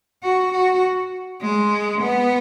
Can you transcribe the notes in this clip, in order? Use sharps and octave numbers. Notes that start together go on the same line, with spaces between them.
F#4
F#4
G#3
B3